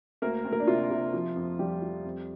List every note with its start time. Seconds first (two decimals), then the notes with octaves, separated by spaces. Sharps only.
0.22 D2 A#3 A#4
0.45 D2
0.52 A#3 A#4
0.60 D4
0.67 C3 F4
0.90 C3
1.13 F3
1.36 F2
1.59 F3 G3 G4
1.82 F3
2.05 F2